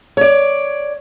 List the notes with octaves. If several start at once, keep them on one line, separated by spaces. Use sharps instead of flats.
C#5 D5